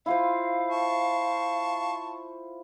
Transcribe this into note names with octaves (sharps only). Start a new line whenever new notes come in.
E4 F4 C5 F5
A5 C#6